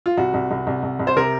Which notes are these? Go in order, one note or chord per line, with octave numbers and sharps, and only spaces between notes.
F4
C2 F#4
C2
C2
C2
C2
C2
C5
C3 A#4